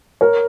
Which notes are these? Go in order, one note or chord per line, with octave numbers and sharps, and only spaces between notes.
A#4 C#5